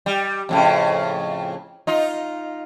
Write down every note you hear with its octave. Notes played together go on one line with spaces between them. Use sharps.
G3
F2 A2 C#3
D#4 F4